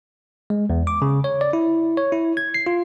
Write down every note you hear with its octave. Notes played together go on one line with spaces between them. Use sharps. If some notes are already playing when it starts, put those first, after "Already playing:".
G#3
E2
D6
C#3
C#5
D5
E4
C#5
E4
G#6
C7
F4